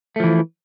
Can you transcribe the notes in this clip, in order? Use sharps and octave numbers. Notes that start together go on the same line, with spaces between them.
E3 F3 A3